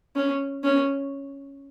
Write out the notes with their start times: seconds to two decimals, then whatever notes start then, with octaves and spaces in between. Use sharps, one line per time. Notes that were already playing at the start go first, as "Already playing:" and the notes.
0.16 C#4
0.64 C#4